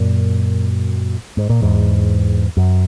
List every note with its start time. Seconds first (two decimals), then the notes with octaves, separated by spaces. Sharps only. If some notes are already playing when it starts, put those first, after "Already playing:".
Already playing: F#2 A#2
1.37 G#2
1.50 A#2
1.62 E2 G#2
2.57 F#2